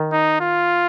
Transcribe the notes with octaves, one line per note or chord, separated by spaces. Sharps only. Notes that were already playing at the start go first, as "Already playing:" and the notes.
Already playing: D#3
D#4
F4